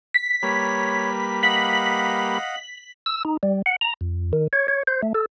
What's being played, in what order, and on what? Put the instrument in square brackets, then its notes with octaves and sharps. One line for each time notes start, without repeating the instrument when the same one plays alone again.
[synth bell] B6
[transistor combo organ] G3 A#3 B4 [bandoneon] C#5
[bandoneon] D#5 F5 F#5 [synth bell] B6 F#7
[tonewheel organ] E6
D#4
G3
F#5
A#5
F2
D#3
C#5
C#5
C5
A3
A4